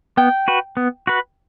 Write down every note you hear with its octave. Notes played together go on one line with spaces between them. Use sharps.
B3 G5
F#4 B4
B3
F#4 B4